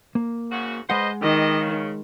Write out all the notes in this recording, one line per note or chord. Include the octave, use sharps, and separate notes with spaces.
A#3
G#2 C#3 F#4
G#3 B4 C5 D#5 F#5
D#3 E3 G4 D#5
C#3